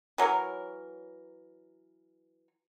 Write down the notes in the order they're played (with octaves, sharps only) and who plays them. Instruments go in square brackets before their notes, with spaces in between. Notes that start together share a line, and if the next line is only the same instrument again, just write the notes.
[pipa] E3 F#3 A#4 C#5